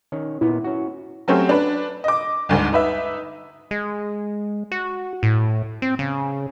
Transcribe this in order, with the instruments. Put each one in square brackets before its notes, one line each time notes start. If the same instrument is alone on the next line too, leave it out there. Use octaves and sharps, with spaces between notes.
[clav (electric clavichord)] D#3 C#4
[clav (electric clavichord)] A#2 B3 [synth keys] E4
[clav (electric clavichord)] C#4 F#4
[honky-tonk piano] F#3 A3 C4 C#4 G4
D4 B4
D#5 D6
G1 D2 G#2
D#4 B4 E5
[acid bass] G#3
F#4
A2
C4
C#3